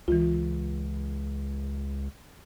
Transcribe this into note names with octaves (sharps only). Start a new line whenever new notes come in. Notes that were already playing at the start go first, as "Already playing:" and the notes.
C#2 E3 F4